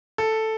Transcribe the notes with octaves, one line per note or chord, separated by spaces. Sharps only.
A4